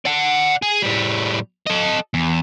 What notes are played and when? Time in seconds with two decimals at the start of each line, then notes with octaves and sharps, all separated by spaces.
0.05 D5 F#5
0.62 G#4
0.82 A2 G3
1.66 A4 D#5
2.14 E2